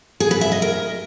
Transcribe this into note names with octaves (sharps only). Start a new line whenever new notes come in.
G#4
B4
E5
D#5
A#4